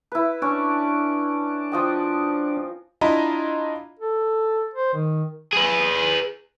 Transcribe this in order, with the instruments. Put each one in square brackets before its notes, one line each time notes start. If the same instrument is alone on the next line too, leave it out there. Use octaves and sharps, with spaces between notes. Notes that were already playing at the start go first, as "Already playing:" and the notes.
[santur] E4 B4
[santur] C#4 [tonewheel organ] D4
[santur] F3 D#5 G5
[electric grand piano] D4 E4 F4 D#5 A#5 B5
[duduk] A4
C5
D#3
[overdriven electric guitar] G#4 B4